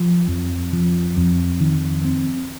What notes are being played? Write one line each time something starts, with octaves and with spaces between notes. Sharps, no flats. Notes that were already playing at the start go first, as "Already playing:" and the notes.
Already playing: F3
F2
F3
F2
D#3
C4